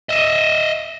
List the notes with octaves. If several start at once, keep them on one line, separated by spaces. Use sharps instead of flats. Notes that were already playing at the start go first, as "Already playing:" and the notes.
D#5 E5